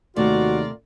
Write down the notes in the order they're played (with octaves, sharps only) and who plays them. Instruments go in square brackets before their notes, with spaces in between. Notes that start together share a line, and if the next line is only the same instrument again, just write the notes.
[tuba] D#2 [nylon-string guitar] C3 A3 [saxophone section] F4 A#4 D5 [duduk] F#4